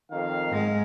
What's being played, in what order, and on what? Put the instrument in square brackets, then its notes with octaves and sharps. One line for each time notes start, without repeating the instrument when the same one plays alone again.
[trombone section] F2 D#3 [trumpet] F5
[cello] G#2 G#3